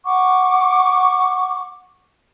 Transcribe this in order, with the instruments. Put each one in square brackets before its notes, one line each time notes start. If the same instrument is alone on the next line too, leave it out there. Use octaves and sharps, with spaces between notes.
[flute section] F#5 C#6 D6